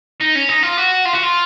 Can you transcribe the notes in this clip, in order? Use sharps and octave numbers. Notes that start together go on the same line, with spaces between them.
D#4
C#4
D#4
F4
F#4
F4
F#4
F4